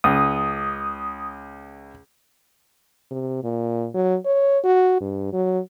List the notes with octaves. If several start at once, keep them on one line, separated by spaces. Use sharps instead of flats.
C#2 D#6
C3
A#2
F#3
C#5
F#4
G2
F#3